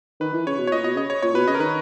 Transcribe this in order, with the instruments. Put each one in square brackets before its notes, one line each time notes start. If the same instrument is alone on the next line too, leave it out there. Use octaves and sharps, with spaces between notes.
[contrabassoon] D#3 [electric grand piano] B4
[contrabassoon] E3
[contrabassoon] C#3 [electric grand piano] C#5
[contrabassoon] B2
[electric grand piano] C#5
[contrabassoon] A#2 [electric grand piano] D#5
[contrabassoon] B2 [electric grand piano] D#5
[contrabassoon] C#3 [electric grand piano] D#5
[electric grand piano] C#5
[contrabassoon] A#2 [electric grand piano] C#5
[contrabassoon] B2 [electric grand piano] B4
[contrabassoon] C#3 [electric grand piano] D#5
[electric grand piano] A#4
[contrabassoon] D#3 [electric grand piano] B4